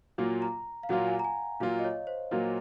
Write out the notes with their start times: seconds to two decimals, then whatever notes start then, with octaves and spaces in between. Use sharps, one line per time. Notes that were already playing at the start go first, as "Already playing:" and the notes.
0.18 A#2 F#3 A#3 F4
0.42 A#5
0.83 F5
0.89 A#2 F#3 A#3 F4 F#5
1.08 G#5
1.19 A#5
1.24 G#5
1.60 A#2 F#3 A#3 F4 F5
1.79 D#5
1.84 C#5
2.07 C5
2.31 A#2 F#3 A#3 F4 A#4